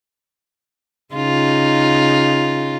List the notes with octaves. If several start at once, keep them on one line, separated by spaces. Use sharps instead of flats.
C#3 D#4 F4